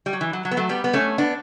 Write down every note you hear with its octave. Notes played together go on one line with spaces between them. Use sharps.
G3
F#3
E3
F#3
F#3
B3
F#3 A3
G3 B3
B3
A3 C#4
B3 D4